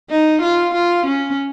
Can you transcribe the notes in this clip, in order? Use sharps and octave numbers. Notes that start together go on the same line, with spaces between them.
D#4
F4
F4
C#4